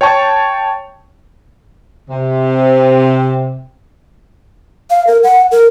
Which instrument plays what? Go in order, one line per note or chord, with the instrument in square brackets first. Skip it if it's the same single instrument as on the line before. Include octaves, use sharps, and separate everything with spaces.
[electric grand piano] C#5 G5 A5 C#6
[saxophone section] C3
[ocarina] F5
A#4
F#5
A#4